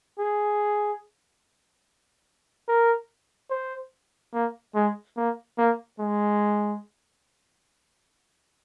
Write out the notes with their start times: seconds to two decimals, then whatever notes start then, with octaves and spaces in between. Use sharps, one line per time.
0.19 G#4
2.68 A#4
3.50 C5
4.33 A#3
4.75 G#3
5.17 A#3
5.58 A#3
5.99 G#3